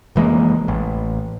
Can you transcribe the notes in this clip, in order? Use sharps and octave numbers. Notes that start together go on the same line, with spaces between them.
F1 E3 G#3 A#3
A1